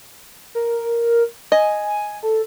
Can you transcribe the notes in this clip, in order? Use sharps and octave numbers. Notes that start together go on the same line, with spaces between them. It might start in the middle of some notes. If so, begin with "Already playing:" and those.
A#4
D#5 G#5
A4